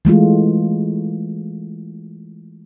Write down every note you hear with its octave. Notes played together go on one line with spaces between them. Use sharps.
E3 G#3 A3 F4